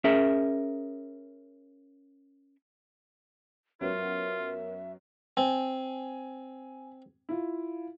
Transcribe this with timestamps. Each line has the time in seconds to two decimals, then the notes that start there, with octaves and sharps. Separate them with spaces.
0.04 C#4 G#4 A#4 E5
3.81 F#2 F#3 B3 F4 A#4 E5
5.37 C4 G#5
7.29 E4 F4